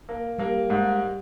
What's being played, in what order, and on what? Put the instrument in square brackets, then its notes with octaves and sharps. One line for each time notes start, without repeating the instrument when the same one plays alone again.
[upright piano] A#3
[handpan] G3 [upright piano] A#3
[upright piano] G#2